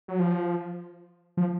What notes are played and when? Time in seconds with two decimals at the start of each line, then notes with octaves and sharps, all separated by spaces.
0.08 F#3
0.20 F3
1.37 F3